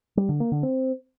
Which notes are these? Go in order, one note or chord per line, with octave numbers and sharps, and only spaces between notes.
G3
D3
A#3
D3
C4